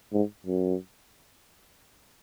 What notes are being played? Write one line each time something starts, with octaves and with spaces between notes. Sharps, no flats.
G#2
F#2